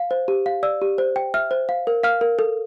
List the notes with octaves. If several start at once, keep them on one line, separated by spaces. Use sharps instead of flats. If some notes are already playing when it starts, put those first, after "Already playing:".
Already playing: F5
C5
G4
F5
D5 E6
G4
C5
G5
E5 F6
C5
F5
A#4
F5 F6
A#4
A4